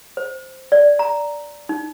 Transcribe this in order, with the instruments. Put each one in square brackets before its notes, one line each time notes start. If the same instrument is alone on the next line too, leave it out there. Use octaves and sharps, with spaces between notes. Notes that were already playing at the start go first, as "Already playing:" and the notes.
[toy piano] C5
D5
A#5
D#4